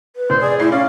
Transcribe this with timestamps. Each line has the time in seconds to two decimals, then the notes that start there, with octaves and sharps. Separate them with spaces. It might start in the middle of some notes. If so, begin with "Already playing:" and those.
0.16 B4
0.30 F1 C5
0.42 G#4 D5
0.60 A2 A3 E4 C7
0.72 C#4 D5 F5